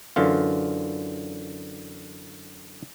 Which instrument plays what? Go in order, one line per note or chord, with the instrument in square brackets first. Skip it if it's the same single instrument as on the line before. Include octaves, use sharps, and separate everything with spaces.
[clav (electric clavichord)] F#2 D3 E3 F4